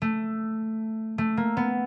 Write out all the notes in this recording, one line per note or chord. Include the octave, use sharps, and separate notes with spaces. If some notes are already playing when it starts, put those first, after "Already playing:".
A3
A3
A#3
B3